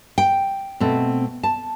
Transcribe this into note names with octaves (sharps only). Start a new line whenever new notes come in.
G5
B2 A3 C4
A5